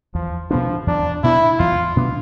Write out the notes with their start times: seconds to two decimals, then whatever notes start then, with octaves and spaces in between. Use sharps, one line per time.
0.15 E2 F3
0.50 B2 F3 B3 D4
0.87 E2 D4
1.24 B2 B3 D4 E4
1.59 E2 F4
1.96 B2 B3 D4